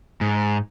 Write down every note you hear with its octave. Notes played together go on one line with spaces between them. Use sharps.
G#2